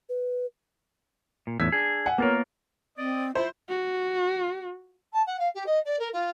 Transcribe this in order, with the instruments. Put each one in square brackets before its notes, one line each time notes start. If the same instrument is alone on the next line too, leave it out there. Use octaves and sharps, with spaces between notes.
[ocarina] B4
[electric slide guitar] A#2
[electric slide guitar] E2 A2 [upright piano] E6 G#6 B6
[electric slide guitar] D4 G#4
[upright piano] F#5 G#5
[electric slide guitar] A#3 F4 A#4 [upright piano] B3 C#5
[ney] C4 [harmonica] D5 D#5
[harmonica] E4 [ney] F4 [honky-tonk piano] C5
[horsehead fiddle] F#4
[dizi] A5
F#5
F5
G4
D#5
D5
A#4
F4